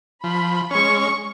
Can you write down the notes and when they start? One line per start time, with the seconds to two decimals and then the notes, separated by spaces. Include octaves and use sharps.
0.24 F3 B5
0.71 G#3 C#4 C#6